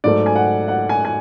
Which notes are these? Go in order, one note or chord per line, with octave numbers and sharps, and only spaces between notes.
G#2 F#3 A3 D5
G#5
F#5
F#5
G#5
G#5